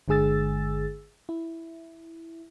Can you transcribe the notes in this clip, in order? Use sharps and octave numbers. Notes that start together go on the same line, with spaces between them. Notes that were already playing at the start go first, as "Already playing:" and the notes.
G1 D3 G#3 G#4 E6 A6
E4